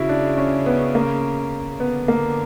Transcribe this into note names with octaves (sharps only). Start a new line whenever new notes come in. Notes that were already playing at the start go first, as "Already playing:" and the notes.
Already playing: C#3 E4 F#4
D4
C#4
B3
A#3
D3 B3
A#3